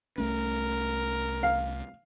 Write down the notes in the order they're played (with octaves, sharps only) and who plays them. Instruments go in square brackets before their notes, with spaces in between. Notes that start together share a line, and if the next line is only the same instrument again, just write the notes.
[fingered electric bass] C2 A3 C#4 [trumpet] A#4
[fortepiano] F5